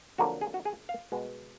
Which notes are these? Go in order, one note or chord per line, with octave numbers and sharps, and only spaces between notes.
F2 D3 F#3 A#3 F#4
G#4
F#4
G#4
F5
B2 G#3 B3